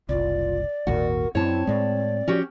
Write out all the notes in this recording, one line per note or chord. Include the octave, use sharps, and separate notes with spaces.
F#1 C2 F4 D5
G#1 D#2 A#2 F#4 A#4
F#2 C4 E4 C#5 A5
A2 G#3 D5
F3 C#4 F#4 G4